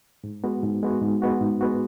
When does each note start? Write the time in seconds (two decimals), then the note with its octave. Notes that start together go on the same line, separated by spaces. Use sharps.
0.24 G#2
0.44 G#3 B3 F#4
0.63 G#2
0.83 G#3 B3 F#4
1.02 G#2
1.22 G#3 B3 F#4
1.41 G#2
1.61 G#3 B3 F#4